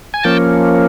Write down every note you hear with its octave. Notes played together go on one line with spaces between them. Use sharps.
G#5
F3 A#3 C#4 G5 A5